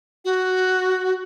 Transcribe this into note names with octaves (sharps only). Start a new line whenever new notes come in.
F#4